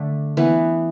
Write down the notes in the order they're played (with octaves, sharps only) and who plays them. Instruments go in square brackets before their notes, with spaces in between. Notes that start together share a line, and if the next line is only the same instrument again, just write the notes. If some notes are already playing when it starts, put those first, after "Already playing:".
Already playing: [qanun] D3 A3 D4
E3 B3